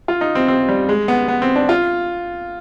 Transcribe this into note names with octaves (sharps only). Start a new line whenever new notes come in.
F4
D#4
C4
C4
G3
G#3
B3
B3
C4
D4
F4